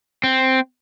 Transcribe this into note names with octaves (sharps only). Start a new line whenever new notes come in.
C4